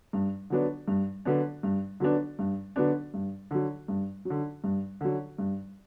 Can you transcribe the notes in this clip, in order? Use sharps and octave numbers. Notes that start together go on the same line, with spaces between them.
G2
D3 F#3 B3 D4
G2
D3 F#3 B3 D4
G2
D3 F#3 B3 D4
G2
D3 F#3 B3 D4
G2
D3 F#3
G2
F#3
D3
G2
D3 F#3
G2